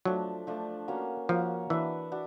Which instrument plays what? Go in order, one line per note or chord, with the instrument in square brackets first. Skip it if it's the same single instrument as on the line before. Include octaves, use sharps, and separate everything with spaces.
[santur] F3 A3 D4 [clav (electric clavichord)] F#3
[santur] F3 A3 D4
A#3 C#4 F#4
[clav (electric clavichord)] F3 [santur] A#3 C#4 F#4
[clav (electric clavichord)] E3 [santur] D4 F#4 B4 E5
[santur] D4 F#4